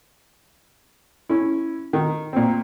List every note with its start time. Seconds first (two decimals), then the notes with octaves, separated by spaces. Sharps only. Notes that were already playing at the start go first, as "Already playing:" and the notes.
1.29 C#4 E4
1.93 D#3
2.33 A#2 C4